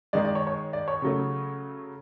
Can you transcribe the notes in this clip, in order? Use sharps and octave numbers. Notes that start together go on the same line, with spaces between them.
D#3 G#3 D5
D5
C#5
C#5
D5
C#5
C#3 F#3 A3